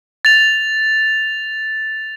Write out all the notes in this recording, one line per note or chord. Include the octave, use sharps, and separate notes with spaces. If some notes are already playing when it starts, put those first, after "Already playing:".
A6 F7